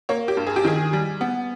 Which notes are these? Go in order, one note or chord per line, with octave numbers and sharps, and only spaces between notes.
A#3 C#5
G4
G2
G#4
G4
D#3 G#4
G3
B3